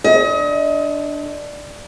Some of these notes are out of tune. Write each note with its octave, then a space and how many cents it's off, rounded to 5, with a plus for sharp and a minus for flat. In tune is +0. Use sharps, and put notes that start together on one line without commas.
D3 +0 D#5 +30